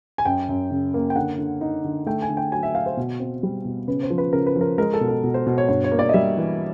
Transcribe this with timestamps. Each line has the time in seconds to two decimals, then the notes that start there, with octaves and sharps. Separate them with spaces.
0.18 G#5
0.25 F#2 G5
0.49 F#2
0.71 C#3
0.94 A#3
1.10 G5
1.16 D3 F#5
1.38 D3
1.61 D#4
1.84 D3
2.06 A3 G5
2.22 G#5
2.29 D3
2.37 G5
2.52 F#3 G#5
2.63 E5
2.75 F#3 F5
2.86 C5
2.97 B2
3.20 C4
3.43 G3
3.65 B2
3.88 C#3 B4
4.03 C5
4.10 F3
4.18 B4
4.33 C#3 A#4
4.47 B4
4.56 F3
4.61 A#4
4.78 G#3 A#4
4.94 A4
5.01 B2
5.08 A4
5.24 B2
5.34 C5
5.47 B2
5.58 C#5
5.69 G2 C#5
5.84 C#5
5.92 A#3
5.99 D5
6.09 D#5
6.14 G3 E5
6.37 E3